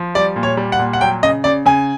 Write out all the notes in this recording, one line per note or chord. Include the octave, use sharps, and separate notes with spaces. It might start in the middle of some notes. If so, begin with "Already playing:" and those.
Already playing: F3
G3 D5
A#2
C#5
G3
F#5
A#2
F#5
F#3 G5
C#3 D#5
C#3 D5
C#3 G#5